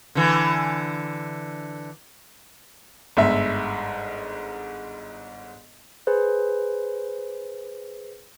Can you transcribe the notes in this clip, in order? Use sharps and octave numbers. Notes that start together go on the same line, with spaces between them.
D3 E3
G1 G#2 E5
G#4 B4 C5